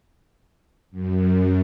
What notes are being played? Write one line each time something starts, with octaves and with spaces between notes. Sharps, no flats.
F#2